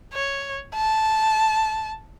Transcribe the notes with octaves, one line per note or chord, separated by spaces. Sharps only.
C#5
A5